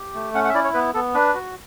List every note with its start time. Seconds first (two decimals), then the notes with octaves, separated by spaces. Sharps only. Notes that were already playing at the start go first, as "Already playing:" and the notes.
Already playing: G4
0.14 A3
0.34 C#4 F#5
0.45 F#5
0.49 E5
0.55 E4 D5
0.64 C#5
0.74 B3 B4
0.94 B3 A4
1.14 D4 B4
1.34 F#4